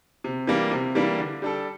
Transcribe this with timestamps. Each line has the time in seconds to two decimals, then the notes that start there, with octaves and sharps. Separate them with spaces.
0.24 C3
0.47 E3 G3 A#3 D4
0.71 C3
0.95 E3 G3 A#3 D4
1.19 D3
1.42 G3 D4 A4